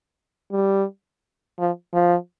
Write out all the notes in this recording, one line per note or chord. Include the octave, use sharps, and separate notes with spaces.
G3
F3
F3